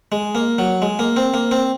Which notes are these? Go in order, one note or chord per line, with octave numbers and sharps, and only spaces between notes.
G#3
A#3
F#3
G#3
A#3
C4
A#3
C4